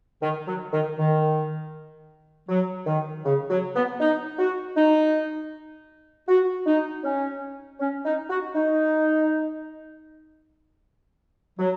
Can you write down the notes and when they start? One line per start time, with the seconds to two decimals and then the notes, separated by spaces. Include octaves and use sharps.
0.22 D#3
0.47 F#3
0.72 D#3
0.98 D#3
2.49 F#3
2.86 D#3
3.26 C#3
3.50 F#3
3.75 B3
4.00 D#4
4.39 F#4
4.77 D#4
6.28 F#4
6.66 D#4
7.04 C#4
7.80 C#4
8.04 D#4
8.29 F#4
8.56 D#4
11.59 F#3